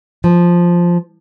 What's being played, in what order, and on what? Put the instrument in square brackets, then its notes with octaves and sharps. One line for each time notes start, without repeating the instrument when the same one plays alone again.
[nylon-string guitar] F3